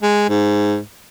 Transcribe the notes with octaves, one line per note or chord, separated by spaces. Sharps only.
G#3
G#2